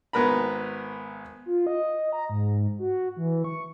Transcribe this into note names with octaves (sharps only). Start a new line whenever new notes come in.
G#1 B3 A#4 A#5 B5
F4
D#5
A#5
G#2
F#4
E3
C#6